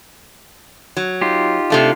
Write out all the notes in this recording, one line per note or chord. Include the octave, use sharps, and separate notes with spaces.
F#3
D#4 F4 G4
C3 A3 D4